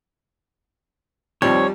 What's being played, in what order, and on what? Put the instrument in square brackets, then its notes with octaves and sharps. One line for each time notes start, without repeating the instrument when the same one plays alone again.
[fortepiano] D#2 F3 [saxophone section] G3 [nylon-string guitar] C4 [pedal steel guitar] C#5